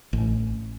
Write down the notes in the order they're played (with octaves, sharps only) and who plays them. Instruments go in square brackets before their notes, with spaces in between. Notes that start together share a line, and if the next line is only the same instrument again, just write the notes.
[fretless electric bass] A1